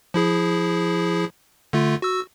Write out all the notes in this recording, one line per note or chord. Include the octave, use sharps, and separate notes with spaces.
F3 E4 G#4
D3 A3 F4
F#4 E6